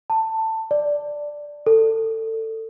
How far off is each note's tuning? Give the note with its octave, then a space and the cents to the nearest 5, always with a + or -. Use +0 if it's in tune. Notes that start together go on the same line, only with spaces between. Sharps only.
A5 +15
D5 +0
A4 +25